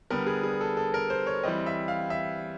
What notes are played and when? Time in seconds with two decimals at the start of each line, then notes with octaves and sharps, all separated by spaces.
0.10 D3 G3 B3 A#4
0.26 G#4
0.43 G#4
0.61 A4
0.77 A4
0.94 A#4
1.10 C5
1.26 C#5
1.43 E3 G3 C4 D#5
1.66 E5
1.88 F5
2.10 E5